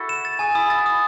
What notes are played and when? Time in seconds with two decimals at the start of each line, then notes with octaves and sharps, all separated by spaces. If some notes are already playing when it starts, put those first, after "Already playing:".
Already playing: E4 F#4 A4
0.09 E7
0.25 A6
0.39 G#4 G#5
0.55 E4 D#6
0.70 E4 A6
0.86 D#6